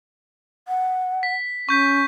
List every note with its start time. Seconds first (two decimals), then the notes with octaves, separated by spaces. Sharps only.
0.68 F#5
1.23 B6
1.69 C#4 C#6 G6 B6